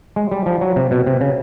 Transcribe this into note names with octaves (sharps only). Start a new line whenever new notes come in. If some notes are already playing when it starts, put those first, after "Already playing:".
G#3
G3
F3
F#3
C3
B2
C3
C#3